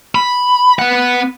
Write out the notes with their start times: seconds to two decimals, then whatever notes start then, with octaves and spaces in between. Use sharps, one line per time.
0.15 B5
0.79 B3 F#5